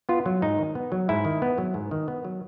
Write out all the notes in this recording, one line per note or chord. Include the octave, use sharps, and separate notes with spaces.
B3 F4
F#3
G#2 D#4
D#3
B3
F#3
G#2 E4
D#3
B3
F#3
G#2
D#3
B3
F#3